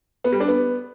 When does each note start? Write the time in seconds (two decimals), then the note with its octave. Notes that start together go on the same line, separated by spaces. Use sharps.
0.24 B3
0.32 G3
0.40 D4
0.48 B3